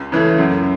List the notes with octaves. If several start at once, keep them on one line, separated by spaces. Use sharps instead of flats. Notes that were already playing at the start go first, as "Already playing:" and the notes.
Already playing: C#2
C#3 E3 A3
F#2